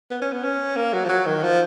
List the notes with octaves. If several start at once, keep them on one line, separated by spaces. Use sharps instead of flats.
B3
C#4
B3
C#4
A#3
F#3
F3
F#3
D#3
F3